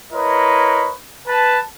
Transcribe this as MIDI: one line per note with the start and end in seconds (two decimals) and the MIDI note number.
0.13 0.91 64
0.13 0.91 70
0.13 0.91 71
0.13 0.91 73
0.13 0.91 75
1.28 1.59 71
1.28 1.59 81